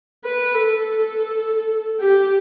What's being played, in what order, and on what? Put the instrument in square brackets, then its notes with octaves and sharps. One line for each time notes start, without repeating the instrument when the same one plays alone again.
[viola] B4
A4
G4